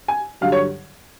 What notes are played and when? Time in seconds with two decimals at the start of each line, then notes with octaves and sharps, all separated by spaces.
0.08 G#5
0.41 G2 D3 F#3 F5
0.52 C#5